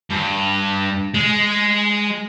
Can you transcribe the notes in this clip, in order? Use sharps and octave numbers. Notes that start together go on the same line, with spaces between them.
G2
G#3